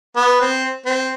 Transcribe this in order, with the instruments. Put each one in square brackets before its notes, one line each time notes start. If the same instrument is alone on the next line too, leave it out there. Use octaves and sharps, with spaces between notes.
[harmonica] B3
C4
C4